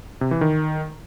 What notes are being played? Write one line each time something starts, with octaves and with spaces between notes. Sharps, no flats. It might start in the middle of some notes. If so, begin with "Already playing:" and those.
C3
E3
D#3